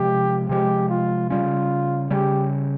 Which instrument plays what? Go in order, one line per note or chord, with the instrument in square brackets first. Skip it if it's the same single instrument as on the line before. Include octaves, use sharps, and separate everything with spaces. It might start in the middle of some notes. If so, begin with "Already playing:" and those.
Already playing: [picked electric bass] C3 F3 G#3 [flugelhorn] G4
[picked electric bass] C3 F3 G#3 [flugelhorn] G4
[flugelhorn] F4
[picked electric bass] C#3 G3 C#4 [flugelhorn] F4
[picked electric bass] C#3 G3 C#4 [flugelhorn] G4